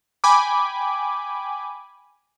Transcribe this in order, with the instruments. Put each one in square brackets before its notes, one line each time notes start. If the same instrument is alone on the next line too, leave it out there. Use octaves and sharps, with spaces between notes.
[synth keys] G5 G#5 B5 D6